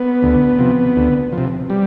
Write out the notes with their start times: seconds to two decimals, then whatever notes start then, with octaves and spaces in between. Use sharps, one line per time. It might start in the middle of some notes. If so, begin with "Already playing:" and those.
Already playing: B3
0.22 D2
0.59 C3 F3
0.96 D2
1.32 F3
1.38 C3
1.70 G3